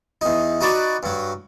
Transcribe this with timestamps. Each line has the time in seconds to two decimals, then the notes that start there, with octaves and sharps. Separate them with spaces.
0.21 E2 D#4
0.61 D#4 F#4 B4 D5
1.03 G2 F#3